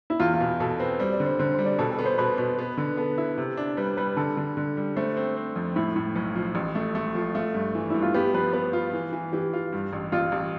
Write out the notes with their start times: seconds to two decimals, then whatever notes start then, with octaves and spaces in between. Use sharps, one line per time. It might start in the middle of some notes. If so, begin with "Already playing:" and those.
0.10 E4
0.20 E2 F4
0.34 F4
0.40 B2
0.60 B2 A4
0.79 C4 B4
1.00 G3 C5
1.12 D5
1.20 D3
1.26 C5
1.39 D3 C5
1.52 C5
1.59 G3
1.65 D5
1.79 B2 A4
1.92 A4
1.99 B3
2.05 C5
2.18 B2 B4
2.38 B2
2.59 B3
2.77 D3
2.97 B3 A4
3.18 E4
3.38 C3
3.57 D4
3.77 G3 B4
3.97 G3 B4
4.17 D3 A4
4.37 D3
4.57 D3
4.77 G3
4.96 A3 C5
5.16 C4
5.36 C4
5.56 F2
5.76 A2 E4
5.96 A2
6.16 B1
6.35 F3
6.55 A1
6.75 A3
6.95 A3
7.15 F3
7.35 A3 F4
7.54 G2
7.75 E3
7.90 G2 E4
8.02 F4
8.14 B3 G4
8.34 F3 B4
8.53 B3 B4
8.73 F4
8.93 E3
9.13 E3
9.33 E3 G4
9.53 F4
9.72 G2
9.93 A1
10.12 A1 F4
10.32 A1